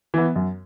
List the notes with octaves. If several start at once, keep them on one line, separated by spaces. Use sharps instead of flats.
E3 B3
F#2